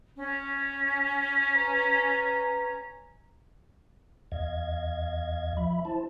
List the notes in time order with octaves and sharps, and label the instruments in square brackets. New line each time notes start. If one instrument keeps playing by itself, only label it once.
[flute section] C#4
[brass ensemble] B4 A#5
[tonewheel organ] E2 D#5 F5 G#6
F3 E5 B5
E4 C5 A5